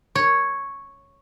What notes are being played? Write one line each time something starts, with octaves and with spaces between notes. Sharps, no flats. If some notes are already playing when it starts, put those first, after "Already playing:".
C#5